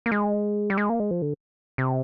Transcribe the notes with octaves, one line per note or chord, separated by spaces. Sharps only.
A#3
G#3
G3
G#3
A#3
G#3
F3
D3
C3